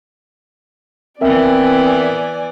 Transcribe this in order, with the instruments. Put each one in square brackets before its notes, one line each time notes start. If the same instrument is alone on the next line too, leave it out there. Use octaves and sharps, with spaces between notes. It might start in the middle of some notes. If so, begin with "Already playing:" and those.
[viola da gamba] E3 B3 [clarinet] C4 [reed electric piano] A#4 E5 [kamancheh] D5 G#5